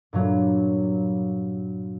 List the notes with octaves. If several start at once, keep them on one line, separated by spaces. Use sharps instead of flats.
G2 A#2 F#3